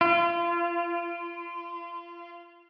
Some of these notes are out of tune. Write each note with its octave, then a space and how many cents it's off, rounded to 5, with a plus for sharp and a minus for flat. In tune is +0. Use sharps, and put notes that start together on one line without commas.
F4 -30